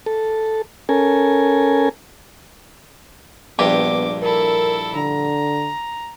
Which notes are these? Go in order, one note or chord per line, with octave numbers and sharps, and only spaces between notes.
A4
C#4 A4 A#4 G#5
A#1 G2 B3 G4 D6
E4 A4 A#4
D3 A#5